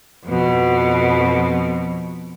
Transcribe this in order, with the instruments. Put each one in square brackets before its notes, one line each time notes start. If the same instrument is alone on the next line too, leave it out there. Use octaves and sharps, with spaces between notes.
[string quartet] F2 B2